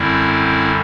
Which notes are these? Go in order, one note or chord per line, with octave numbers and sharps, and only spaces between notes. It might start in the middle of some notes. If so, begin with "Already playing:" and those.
Already playing: F#2 D3 G3 C4 E4